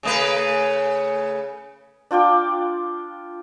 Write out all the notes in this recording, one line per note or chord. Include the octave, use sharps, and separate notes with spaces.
C#3 A3 B4
D4 F4 G5 D6